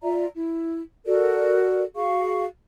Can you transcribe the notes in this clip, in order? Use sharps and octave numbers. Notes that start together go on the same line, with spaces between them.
F4 D5 E5 A#5
E4
F#4 A4 A#4 D5
F#4 G#4 F5 C#6